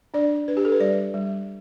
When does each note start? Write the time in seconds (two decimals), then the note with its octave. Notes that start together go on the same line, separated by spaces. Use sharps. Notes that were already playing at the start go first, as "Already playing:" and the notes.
0.14 D4 D5
0.48 D4 B4
0.57 G4
0.65 A4
0.72 B4
0.80 G3 D5
1.14 G3